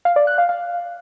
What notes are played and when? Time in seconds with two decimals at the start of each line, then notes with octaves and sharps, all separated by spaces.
0.05 F5
0.16 D5
0.27 F#6
0.38 F5
0.49 F5